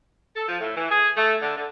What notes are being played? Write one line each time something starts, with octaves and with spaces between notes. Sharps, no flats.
A4
F3
A2
E3
G#4
A3
D3
D3